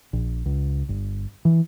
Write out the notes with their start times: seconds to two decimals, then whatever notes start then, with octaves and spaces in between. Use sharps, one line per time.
0.13 A#1
0.46 C#2
0.89 G1
1.45 E3